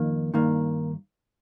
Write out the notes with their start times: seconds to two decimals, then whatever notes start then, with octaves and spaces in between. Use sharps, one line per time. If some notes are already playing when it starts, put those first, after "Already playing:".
Already playing: F2 D#3 A#3
0.34 G2 D#3 A#3